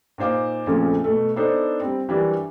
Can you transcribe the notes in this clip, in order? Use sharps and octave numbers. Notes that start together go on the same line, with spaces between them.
A#2 D#4 C5 F5 D6
F2 A#2 C#3 F3 A3
B2 A3
B3 D4 D#4 A4 C5
G3 C4
E3 F#3 G3 D4 G4 A#4